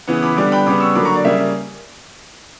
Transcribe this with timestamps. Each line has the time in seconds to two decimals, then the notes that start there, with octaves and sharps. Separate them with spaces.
0.08 C#3 E3 B3
0.22 B5 D6
0.36 D3 G3 B3 B5 D6
0.52 G5 B5
0.66 C#3 G3 B3 B5 D6
0.80 C#6 E6
0.95 D3 F#3 A#3 B5 D6
1.05 A#5 C#6
1.15 D5
1.24 C#3 G3 A#3 E5